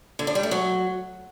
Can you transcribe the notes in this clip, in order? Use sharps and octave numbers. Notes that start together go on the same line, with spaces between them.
D3
D4
G3
A3
F#3